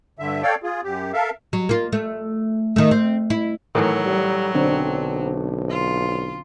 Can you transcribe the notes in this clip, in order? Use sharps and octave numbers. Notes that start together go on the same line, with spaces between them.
G2 D3 E5
A4 C#5 D5 F5 G5
F4 G#4
F#2 G4
A4 A#4 E5 F5
F#3
A#3 F4
A3
D#3 A3
C4
E4
A2 D#3 E3 F#3
G3
B1 D3 C4 D4
F4